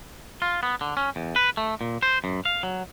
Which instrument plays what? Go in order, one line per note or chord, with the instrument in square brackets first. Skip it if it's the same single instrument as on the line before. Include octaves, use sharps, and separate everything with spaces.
[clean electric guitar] F4
B3
D3
C#4
E2
B4
A3
A#2
C5
F#2
F5
F#3